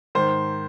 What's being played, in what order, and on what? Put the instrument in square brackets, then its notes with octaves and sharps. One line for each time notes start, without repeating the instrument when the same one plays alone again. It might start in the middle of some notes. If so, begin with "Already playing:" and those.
[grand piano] G#2 D#3 C5